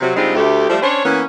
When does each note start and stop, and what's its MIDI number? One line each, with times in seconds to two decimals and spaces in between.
0.01 0.16 48
0.01 0.16 54
0.16 0.35 50
0.16 0.35 55
0.16 0.35 56
0.16 0.35 60
0.16 0.35 63
0.16 0.35 65
0.35 0.66 38
0.35 0.66 57
0.35 0.66 67
0.69 0.78 53
0.69 0.78 55
0.69 0.78 57
0.81 1.04 61
0.81 1.04 62
0.81 1.04 72
0.81 1.04 73
1.05 1.23 52
1.05 1.23 58
1.05 1.23 59
1.05 1.23 61